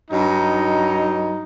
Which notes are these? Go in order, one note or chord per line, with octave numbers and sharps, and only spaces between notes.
G2 F#3 D#4